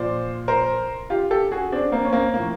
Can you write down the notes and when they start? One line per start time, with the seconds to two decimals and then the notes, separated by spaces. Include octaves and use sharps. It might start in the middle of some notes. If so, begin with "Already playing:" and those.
Already playing: A#2 F3 C5 D5
0.48 A#4 C5
1.10 F4 G4
1.31 G4 A4
1.51 F#4 G#4
1.72 C4 D4
1.92 A#3 C4
2.05 C#4
2.12 A#3 C4
2.34 A2 F3 A#3